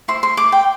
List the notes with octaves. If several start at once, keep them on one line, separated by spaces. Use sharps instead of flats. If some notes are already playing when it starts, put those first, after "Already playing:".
E4 C5 C6
C6
D6
G5